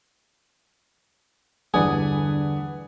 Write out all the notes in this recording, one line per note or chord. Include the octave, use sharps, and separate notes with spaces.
E2 G2 D3 G#4 B4 D5 F#5